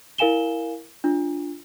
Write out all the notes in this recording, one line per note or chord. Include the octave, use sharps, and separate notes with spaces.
E4 A#4 F5 G#5 E7 G7
D4 F4